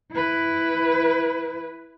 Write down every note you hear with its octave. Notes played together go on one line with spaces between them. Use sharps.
E4 B4